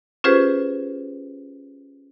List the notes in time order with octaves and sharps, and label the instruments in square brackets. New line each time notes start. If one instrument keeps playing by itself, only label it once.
[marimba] C#4 F4 G4 G#4 B4 C5